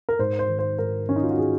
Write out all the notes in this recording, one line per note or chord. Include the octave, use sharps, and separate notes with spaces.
A#4
G#2 C5
C5
D#3
C5
G#2 A#4
D#3 C#4
D#4
F4
F#4
G#4